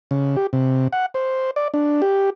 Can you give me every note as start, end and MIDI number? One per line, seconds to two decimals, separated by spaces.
0.11 0.36 49
0.36 0.47 67
0.53 0.88 48
0.92 1.06 78
1.14 1.51 72
1.56 1.68 74
1.74 2.02 62
2.02 2.30 67